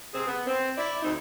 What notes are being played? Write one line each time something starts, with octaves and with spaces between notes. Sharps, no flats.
C3 C4 G#4
B3
C4
E4 D5
D2 C4 D#4